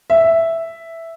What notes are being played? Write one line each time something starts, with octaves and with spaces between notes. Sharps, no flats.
E5